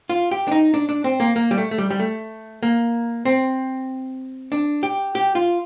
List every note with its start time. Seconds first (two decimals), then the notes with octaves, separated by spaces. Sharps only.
0.10 F4
0.31 G4
0.48 D4
0.51 D#4
0.74 D4
0.89 D4
1.04 C4
1.20 A#3
1.36 A#3
1.51 G3
1.58 A3
1.71 A3
1.78 G3
1.91 G3
1.99 A3
2.63 A#3
3.25 C4
4.52 D4
4.83 G4
5.15 G4
5.35 F4